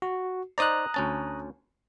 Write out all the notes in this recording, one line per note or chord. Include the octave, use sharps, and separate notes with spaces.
F#4
D#4 C5 D5 A#5 D#6 F#6
D2 C#4 A5